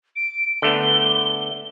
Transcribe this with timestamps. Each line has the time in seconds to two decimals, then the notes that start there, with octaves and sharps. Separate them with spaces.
0.16 D7
0.62 D3 A3 B3 G7